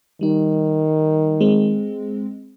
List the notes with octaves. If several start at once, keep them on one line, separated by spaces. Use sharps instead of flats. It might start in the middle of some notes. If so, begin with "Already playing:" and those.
D#3 G3 D#4
G#3 C4